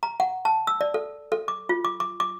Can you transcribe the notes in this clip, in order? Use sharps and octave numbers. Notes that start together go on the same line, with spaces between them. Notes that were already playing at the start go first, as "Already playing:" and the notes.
A#5
F#5
A5
E6
D5
A4
A4
D6
F4
D6
D6
D6